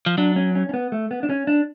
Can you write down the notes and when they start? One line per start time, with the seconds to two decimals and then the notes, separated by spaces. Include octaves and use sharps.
0.06 F3
0.18 F#3 D4
0.36 C#4
0.55 C#4
0.69 C#4
0.74 B3
0.92 A3
1.11 B3
1.23 D4
1.30 C#4
1.47 D4